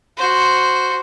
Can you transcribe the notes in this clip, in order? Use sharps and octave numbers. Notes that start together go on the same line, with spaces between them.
F#4 C5